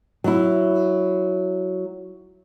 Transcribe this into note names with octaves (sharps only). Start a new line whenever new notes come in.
F#3 E4